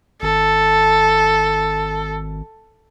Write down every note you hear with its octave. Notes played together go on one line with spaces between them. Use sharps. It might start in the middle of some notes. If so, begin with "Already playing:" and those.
G#1 A4